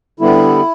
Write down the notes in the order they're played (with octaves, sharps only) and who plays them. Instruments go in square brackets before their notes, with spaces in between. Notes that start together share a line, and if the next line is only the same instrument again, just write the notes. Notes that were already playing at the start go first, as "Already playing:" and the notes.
[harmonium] D3 G3 B3 E4